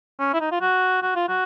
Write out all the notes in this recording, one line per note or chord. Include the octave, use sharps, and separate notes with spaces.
C#4
E4
D#4
F4
F#4
F#4
F4
F#4